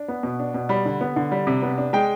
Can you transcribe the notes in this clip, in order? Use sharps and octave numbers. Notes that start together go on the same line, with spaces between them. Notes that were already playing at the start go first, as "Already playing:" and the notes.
Already playing: D4
B3
B2
D4
B2
G3 B5
D3
B3
D3
G3
C3
B3
D4
G#3 G5